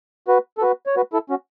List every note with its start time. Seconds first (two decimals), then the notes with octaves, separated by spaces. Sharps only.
0.28 F#4 B4
0.58 A4
0.62 F#4 B4
0.86 C#5
0.96 F#4 B4
1.13 E4 A4
1.30 C#4 F#4